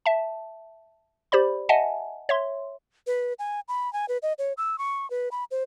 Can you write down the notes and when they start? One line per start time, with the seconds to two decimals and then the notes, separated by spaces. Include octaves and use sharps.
0.06 E5 A5
1.32 G4 C5 D5 B5
1.69 D#5 E5 F#5 G#5 A5
2.29 C#5 E5 C6
3.07 B4
3.39 G#5
3.68 B5
3.93 G#5
4.09 B4
4.23 D#5
4.39 C#5
4.57 E6
4.78 C#6
5.10 B4
5.31 B5
5.51 C5